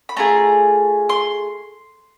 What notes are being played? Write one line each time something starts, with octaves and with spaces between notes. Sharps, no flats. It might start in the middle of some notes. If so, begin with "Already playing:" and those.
B5
A3 D4 F4 G#4 A#5
C6